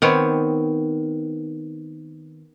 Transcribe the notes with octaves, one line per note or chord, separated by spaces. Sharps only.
D#3 B3 C4 C#5